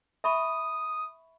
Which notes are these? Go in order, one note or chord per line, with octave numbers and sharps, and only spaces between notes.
E5 B5 C#6 D#6